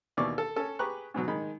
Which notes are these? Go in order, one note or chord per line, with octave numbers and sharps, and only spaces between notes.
D#2 B2 E3 D5 C#6 D6
A4
C#4 A4 C#5
G4 G#4 B4 A#5 C#6 F#6
G#2 B2 F#3
D#3 G#3 D#4 B5